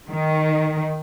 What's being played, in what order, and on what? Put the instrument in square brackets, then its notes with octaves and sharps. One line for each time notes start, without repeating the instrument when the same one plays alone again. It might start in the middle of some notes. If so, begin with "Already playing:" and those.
[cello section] D#3